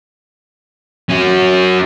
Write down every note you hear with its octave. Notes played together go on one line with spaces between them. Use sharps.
C#4 F#4